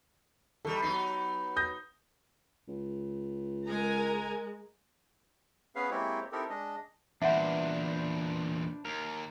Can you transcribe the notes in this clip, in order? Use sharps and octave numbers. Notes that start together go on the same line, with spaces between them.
D#3 G3 A4
F#3 B3 D#4 C7
D#6 G6 A#6
C#2
G#3 A#4 G#5 A#5
B3 C#4 G#4 B4 F5
G#3 A#3 C4 E4 G4 C#5
C4 D#4 E4 G4 A4 A#4
G#3 D4 D#5
E2 A#2 D4 B4 C5 E5 F#5
D#2 A#4